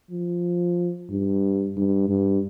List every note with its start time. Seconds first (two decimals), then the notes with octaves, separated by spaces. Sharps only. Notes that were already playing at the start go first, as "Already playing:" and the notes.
0.11 F3
1.10 G2
1.77 G2
2.09 G2